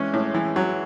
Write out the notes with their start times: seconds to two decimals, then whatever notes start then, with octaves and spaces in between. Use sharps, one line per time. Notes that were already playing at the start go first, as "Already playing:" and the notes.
Already playing: E3 G#3 C#4
0.14 A2
0.34 E3
0.56 F#3